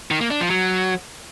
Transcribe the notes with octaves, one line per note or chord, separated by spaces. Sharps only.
D#3
A#3
D4
F3
F#3